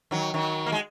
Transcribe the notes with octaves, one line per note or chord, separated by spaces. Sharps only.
D#3 F#3
D#3 F#3
A#3
G#3